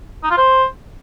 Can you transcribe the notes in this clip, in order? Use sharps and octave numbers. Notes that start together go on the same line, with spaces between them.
D#4
F4
C5